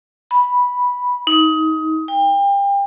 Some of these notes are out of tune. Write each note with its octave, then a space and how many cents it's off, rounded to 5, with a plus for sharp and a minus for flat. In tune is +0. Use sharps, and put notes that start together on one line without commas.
B5 -5
D#4 +20
G5 +30